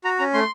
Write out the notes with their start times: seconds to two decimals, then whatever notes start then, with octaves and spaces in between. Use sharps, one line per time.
0.04 F#4 A#5
0.19 C#4 A#5
0.34 A3 C6